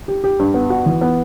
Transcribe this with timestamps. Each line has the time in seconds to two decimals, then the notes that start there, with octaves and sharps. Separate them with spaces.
0.08 G4
0.24 G4
0.39 G2
0.54 B3
0.70 F#4
0.86 E3
1.01 B3